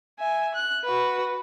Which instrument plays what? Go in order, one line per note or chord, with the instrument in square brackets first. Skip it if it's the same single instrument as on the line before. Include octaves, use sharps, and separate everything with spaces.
[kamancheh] E5 G#5
F#6
F#4 B4